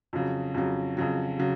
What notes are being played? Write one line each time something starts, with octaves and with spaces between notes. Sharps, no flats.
F2 C#3 F#3
F2 C#3 F#3
F2 C#3 F#3
C#3 F#3